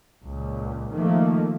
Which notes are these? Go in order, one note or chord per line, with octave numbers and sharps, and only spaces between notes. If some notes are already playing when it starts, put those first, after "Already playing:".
C#2 A#2
D#3 F3 A3 A#3